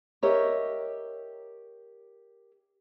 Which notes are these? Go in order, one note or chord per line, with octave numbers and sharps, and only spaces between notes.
G4 A#4 C#5 D#5 E5